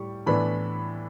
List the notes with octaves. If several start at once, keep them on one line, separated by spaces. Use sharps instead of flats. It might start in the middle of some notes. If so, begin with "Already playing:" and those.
Already playing: A2 G3 C#6
A2 E3 B3 D4 B5